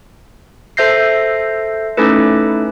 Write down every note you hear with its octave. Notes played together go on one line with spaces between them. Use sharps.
A4 C5 E5 G6 A#6 C7
A3 C#4 D#4 E4 A4 B4